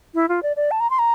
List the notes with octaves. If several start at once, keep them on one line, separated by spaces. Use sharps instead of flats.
E4
F4
D5
D5
A5
A#5
C6
A#5